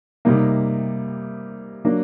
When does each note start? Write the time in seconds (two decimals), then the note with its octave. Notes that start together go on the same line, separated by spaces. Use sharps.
0.25 C3 G3 A#3 D#4
1.85 F#3 A#3 D4